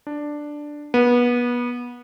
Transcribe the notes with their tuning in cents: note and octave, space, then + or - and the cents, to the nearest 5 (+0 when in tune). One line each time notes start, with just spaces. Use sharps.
D4 +5
B3 -25